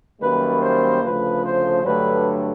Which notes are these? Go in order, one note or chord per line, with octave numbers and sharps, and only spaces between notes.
F#2 D#3 G3 A#3 B4
C5
D2 C#3 F3 A3 B4
C5
G2 D3 F#3 A3 B4